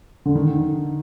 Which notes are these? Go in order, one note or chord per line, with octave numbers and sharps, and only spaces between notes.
D3
D#3